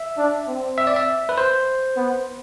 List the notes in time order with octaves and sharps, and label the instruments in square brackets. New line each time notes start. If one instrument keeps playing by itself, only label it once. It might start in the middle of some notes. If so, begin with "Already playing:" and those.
Already playing: [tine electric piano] E5
[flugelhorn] D4
C4
[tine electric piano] E5
D5
E5
B4
C5
[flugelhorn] B3